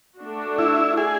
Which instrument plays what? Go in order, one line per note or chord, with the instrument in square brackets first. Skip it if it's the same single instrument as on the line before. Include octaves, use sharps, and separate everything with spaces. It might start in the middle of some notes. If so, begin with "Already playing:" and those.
[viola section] A3 D4 F#4
[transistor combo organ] E4
G#4